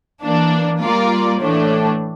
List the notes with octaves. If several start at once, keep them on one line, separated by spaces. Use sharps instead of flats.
E3 A#3 D4
G3 A#3 F4 A#4 D5
A2 E3 A3 D4